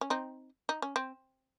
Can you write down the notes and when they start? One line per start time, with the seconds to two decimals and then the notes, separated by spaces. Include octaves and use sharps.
0.01 C#4
0.10 C4 D#4
0.69 D#4
0.82 C#4
0.96 C4